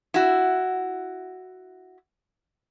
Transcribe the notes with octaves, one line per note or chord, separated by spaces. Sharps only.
E4 F#4